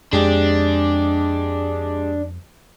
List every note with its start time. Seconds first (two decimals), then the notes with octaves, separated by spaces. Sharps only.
0.13 F2 G#3 D4 G4